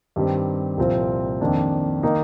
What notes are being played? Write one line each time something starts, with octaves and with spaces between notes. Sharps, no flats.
G2 D#3 G3 C4
C2 A#2 F3 C4 F4
F2 D#3 A#3 D4
D#3 A#3 D#4